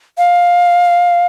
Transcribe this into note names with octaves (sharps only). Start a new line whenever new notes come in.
F5